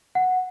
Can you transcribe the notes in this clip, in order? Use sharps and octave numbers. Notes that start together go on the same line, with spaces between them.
F#5